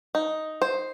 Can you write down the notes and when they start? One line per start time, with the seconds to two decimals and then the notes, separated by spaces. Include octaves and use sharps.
0.15 D#4
0.62 C5